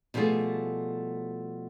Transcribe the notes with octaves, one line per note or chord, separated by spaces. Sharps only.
B2 F3 G3 A3 G#4